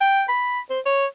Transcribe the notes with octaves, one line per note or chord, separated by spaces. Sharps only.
G5
B5
C5
C#5